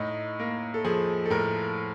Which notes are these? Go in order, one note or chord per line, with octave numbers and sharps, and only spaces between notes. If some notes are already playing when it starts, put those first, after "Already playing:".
Already playing: A2 D#4
A#3
A4
F3 G#4
A4
A2 A#4